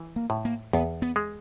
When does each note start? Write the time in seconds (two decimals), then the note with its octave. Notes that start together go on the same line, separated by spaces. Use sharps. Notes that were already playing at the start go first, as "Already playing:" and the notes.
Already playing: E3
0.16 A#3
0.30 A2
0.45 A#3
0.73 E2 B3
1.02 B3
1.16 G#3